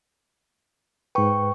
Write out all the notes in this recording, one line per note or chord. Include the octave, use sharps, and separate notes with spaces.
G#2 B4 G5 C#6